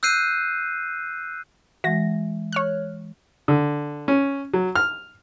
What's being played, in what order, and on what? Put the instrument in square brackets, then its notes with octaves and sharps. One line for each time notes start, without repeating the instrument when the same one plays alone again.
[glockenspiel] E6 F#6 G6 C7 D#7
[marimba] E3 G#3 [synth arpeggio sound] F#4 A#6
[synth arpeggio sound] C#5 F6 F#6
[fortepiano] D3
C#4
F#3
F6